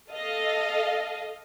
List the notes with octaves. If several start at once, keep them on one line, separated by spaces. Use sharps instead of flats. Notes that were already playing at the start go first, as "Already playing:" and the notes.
A4 D#5 F5